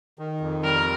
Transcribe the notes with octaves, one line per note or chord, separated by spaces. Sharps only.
D#3
F2
G3 A#4